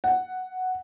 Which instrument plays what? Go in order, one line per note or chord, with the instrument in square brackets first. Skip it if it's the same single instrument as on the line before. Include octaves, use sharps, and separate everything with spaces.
[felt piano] F#5